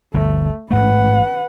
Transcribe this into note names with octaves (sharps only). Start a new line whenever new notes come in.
G1 D2 G2 A3
A1 G#2 A3 B4 F#5